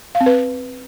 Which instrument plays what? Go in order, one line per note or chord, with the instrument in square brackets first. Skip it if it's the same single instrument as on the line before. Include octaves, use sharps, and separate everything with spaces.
[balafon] F5
C4
B4